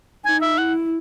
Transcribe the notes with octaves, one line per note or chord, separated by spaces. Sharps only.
D#4 G#5
E5
E4 F#5